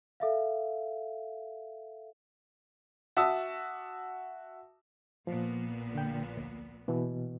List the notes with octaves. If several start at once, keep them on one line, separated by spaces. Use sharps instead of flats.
A4 E5 F5
F#4 E5 A5 D#6 E6
A#1 A#2 F3 B3
D3 G5
D2
B2 E3